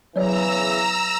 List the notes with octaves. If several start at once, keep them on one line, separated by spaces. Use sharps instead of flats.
E2 C#3 E3 F#3 C#5 D5 A#5 E6